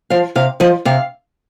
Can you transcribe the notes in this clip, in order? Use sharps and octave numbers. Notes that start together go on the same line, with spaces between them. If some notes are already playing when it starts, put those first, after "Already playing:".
F3 F5
C3 F5
F3 D#5
C3 F5